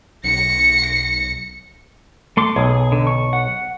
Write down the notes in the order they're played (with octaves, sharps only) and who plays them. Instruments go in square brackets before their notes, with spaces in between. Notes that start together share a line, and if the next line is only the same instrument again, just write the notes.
[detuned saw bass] B1 [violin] A#6 C#7
[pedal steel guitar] A3 C6 D6
[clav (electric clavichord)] B1 [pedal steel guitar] G#4 D#6
[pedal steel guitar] D3
C#6
F#5